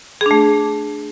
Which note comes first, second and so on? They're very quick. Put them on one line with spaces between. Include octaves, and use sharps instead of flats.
G#4 D4 A3